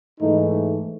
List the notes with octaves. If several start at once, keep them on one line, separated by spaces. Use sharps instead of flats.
G#2 E3 A3 D#4